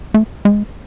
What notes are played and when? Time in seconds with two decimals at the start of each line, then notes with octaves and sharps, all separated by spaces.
0.14 A3
0.45 G#3